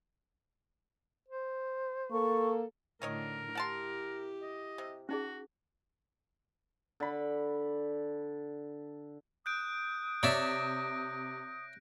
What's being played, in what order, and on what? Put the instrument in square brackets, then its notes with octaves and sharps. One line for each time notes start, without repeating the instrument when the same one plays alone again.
[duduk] C5
[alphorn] A#3 [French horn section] A4 [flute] C#6
[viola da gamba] A2 D3 [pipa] D#3 C#5 D#5 [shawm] A#4
[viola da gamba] E4 G4 [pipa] F#5 A5 C6
[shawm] D#5
[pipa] C3
[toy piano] C#4 D#4 G#4 [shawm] F#4
[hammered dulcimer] D3 B5
[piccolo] D#6 [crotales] F#6 G6 D7
[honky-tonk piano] C3 [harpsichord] C#5 D5 E5 [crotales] A#6 D7